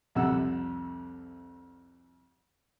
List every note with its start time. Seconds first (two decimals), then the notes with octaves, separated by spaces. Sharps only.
0.15 C2 F2 C3 F#5 E6